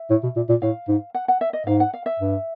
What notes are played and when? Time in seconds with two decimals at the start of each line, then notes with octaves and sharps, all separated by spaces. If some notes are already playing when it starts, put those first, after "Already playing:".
Already playing: E5
0.10 A2
0.23 B2
0.36 A#2
0.49 A#2
0.62 A2 F5
0.88 G#2
1.14 F#5
1.28 F#5
1.41 E5
1.53 D#5
1.66 G#2 F5
1.80 F#5
1.94 F5
2.06 E5
2.19 G2